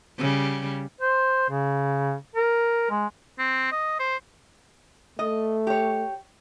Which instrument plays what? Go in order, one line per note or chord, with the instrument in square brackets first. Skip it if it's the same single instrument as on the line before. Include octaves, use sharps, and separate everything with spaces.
[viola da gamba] C#3 G3
[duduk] C5
C#3
A#4
G#3
[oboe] C4
D#5
C5
[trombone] A3 [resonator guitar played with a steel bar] D#5
[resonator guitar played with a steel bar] G4 C#5